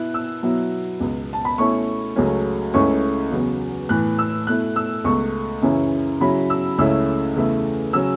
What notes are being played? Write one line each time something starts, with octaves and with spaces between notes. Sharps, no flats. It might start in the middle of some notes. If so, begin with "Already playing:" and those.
Already playing: B2 B3 E4 F#6
E6
B2 F#3 B3 E4
C#2 B2 B3
A5
B5
B2 A3 C#4 E4 C#6
C#2 C#3 F#3 A3 C#4
C#2 C#3 A3 C#4 E4 C#6
E2 C#3 F#3 B3
A2 E3 B3 F#6
E6
B2 A3 E4 F#6
E6
C#2 B2 A3 C#6
F#2 C#3 E3 C#4 E4
C#3 F#3 C#4 E4 B5
E6
C#2 C#3 A3 C#4 E4 E6
E2 C#3 A3 E4
C#3 F#3 C#4 E6